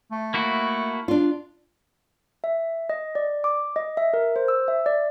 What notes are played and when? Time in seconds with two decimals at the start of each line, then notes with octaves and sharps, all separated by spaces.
0.12 A3
0.34 A#3 E4 F#4
1.08 D4 F4
2.44 E5
2.89 D#5
3.15 D5
3.44 D6
3.76 D#5
3.97 E5
4.14 A#4
4.36 C5
4.48 E6
4.68 E5
4.86 D5